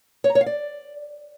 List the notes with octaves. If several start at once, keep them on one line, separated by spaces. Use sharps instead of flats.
C#5
A#5
C#5
F5
D5